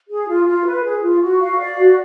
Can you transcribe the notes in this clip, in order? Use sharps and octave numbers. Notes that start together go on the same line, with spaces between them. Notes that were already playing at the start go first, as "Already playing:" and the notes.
G#4
F4
F4
B4
G#4
F4
F#4
F5
D5
F#4